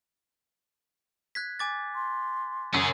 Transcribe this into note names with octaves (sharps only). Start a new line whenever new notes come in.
F#6 G#6 B6
G#5 D6 A6
C6
F#2 C#4 G#4 E6